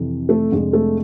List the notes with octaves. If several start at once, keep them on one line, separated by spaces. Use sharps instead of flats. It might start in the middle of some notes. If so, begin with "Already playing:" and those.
Already playing: F2 C3 E3
A3 A4
F2 C3 G#3 D4
A3 A4